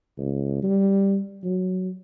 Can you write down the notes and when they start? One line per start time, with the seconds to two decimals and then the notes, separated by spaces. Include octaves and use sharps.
0.18 C#2
0.63 G3
1.44 F#3